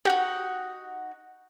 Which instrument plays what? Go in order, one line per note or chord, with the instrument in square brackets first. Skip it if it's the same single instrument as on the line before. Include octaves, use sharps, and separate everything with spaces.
[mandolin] D#4 F#4 [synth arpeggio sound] G4 F#5